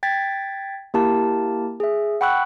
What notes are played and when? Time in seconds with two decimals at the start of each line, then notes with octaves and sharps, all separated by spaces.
0.03 G5 G#6 A6 B6
0.94 A#3 E4 G4 A#4 A5
1.80 G#4 E5
2.21 F#5 G5 B5 C#6 E6 F#6